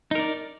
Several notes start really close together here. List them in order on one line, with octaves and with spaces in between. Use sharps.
D#4 A#4 D5